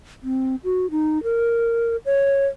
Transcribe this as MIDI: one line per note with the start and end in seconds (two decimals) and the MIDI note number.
0.23 0.56 60
0.64 0.90 66
0.91 1.22 63
1.23 1.96 70
2.06 2.46 73